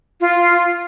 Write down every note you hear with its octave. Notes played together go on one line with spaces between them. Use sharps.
F4